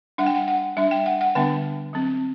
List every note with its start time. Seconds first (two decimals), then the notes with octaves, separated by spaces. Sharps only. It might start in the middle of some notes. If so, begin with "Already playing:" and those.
0.18 G3 D4 F#5
0.26 G5
0.35 F#5
0.48 F#5
0.77 G3 D4 E5
0.91 G5
1.06 F#5
1.21 F#5
1.35 D3 G3 B3 D4 G5
1.93 F#3 C4